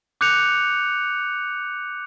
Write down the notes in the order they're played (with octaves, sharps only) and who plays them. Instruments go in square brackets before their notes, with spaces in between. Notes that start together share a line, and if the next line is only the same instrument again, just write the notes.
[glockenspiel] D6 F#6 G6 C#7 F7